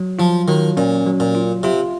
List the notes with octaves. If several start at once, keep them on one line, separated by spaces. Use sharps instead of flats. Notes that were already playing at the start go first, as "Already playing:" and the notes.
Already playing: F#3
F3 F4
D#3 F#3
A#2 C#4
F#3
A#2
F4
C3 F4